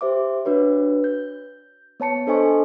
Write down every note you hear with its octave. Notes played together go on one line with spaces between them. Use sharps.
G4 C5 E5 D6
D4 F#4 B4 C#5
G6
B3 C#5 A5 C#7
D4 A4 C5 D#5 G#5 C#6